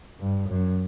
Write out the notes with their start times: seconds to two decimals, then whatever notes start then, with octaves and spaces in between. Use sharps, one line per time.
0.20 G2
0.50 F#2